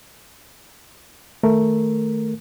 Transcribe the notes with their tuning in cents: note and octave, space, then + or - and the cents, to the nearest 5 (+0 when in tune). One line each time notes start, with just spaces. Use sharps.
D#3 +0 A3 +0 A#4 +0